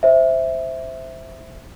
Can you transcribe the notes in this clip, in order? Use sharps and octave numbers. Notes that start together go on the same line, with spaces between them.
C5 E5